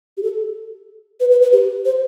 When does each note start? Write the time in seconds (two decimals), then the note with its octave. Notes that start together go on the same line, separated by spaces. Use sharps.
0.17 G4
0.23 A4
1.20 B4
1.31 B4
1.42 B4
1.53 G4
1.85 C5